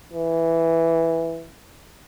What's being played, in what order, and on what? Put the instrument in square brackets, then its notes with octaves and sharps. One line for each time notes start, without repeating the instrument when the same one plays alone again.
[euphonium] E3